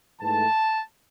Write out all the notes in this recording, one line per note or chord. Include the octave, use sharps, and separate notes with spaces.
G#2 E3 A3 A5